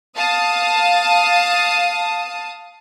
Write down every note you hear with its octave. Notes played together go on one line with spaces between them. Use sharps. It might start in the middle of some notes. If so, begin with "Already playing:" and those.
F5 A5 D#6